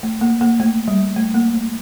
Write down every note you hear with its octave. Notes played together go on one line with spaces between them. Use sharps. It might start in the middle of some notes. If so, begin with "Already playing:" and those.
A3
A#3
A#3
A3
G3
A3
A#3
A3